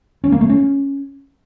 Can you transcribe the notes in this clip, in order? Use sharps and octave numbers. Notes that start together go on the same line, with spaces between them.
C#4
A#3
A3
C#4